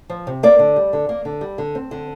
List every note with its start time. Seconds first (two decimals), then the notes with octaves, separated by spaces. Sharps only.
0.10 F3
0.27 C3
0.43 A#3 D5
0.59 D3
0.76 G3
0.93 D3
1.09 A#3
1.25 D3
1.41 G3
1.58 D3
1.75 C4
1.91 D3